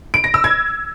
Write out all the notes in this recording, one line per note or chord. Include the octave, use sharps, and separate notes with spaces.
D7
A#6
E6
G#6